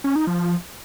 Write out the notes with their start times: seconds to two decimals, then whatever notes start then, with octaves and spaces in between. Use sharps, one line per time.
0.04 C#4
0.16 D#4
0.27 F3